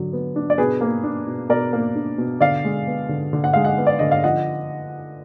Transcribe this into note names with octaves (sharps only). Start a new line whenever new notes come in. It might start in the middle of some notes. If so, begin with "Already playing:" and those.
Already playing: D3 F#3
B3
D4
D5
B2 G#4 B4
A#3
D4
B2
B2 A#4 D5
A#3
D4
B2
D3 D5 F5
G#3
B3
D3
D3
F#5
G#3 F5
D#5 F#5
B3
D5
D3 D#5
F5
F3 D#5 F#5